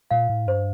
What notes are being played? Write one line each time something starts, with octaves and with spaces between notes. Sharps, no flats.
A#2 F5
A2
G2 C5